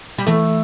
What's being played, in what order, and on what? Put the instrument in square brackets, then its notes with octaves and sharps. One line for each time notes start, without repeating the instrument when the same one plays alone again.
[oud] G3
[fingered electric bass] E3 [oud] A3